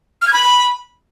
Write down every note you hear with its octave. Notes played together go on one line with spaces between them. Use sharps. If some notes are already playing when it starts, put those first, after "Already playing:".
F6
G#6
B5